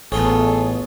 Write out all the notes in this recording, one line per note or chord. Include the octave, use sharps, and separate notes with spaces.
A1 B3 F4 G#4 A4 C#5